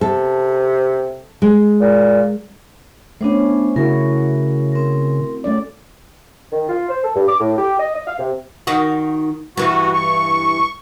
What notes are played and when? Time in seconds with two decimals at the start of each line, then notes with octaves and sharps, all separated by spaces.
0.01 C3 A4
1.42 G#3
1.81 A#2
3.21 A3 B3 C#4 D4 C5
3.76 C#3 E4 F#4 A#4
4.72 C4 A#4
5.44 A3 C#4 D5
6.52 D#3
6.69 F4
6.89 C5
7.04 A4
7.15 G2
7.28 D6
7.40 A2
7.58 G4
7.80 D#5
7.95 D#5
8.07 F5
8.19 C3
8.67 D#3 D#4 F#4
9.57 G2 E3 F#4
9.94 C#6